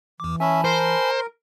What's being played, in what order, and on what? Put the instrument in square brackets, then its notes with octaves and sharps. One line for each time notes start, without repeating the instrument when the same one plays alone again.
[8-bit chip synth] E2 D6 [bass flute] E3
[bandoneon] C#4 E5 [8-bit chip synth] G#5 A5 B5
[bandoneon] A#4 [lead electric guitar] C5